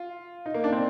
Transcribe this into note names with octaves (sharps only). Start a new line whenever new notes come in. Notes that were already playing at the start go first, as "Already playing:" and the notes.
Already playing: F4
D#4
A#3
D4
C4